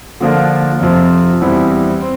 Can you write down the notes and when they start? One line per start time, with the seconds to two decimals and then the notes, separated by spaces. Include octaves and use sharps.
0.20 D3 F3 A#3 D4 F4
0.80 F2 C3 F3 C4
1.41 E2 E3 G3 C4 E4
2.01 C4